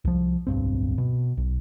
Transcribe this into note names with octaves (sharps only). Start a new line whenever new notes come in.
C2 F3
D1 B1 G2 C4
B2
B1